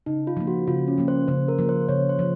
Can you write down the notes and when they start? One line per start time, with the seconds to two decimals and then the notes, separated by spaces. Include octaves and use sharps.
0.06 C#3 D#4
0.27 F4
0.37 F3 A#3
0.47 F#4
0.68 C#3 F4
0.88 C#4
0.98 F3 A#3
1.08 C5
1.28 C#3 C5
1.48 A#4
1.58 F3 A#3
1.69 C5
1.89 C#3 C#5
2.09 C5
2.19 F3